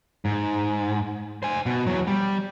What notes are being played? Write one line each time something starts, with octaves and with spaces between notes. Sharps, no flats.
G#2
C5 G#5
B2
E2 F#3
G3